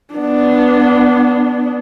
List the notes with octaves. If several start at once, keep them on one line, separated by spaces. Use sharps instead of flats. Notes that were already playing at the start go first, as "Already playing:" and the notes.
B3 D4